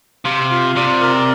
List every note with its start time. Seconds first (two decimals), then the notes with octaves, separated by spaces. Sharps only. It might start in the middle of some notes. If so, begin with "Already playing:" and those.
0.25 C3 F5
0.51 F4
0.76 C3 D5
1.01 A#4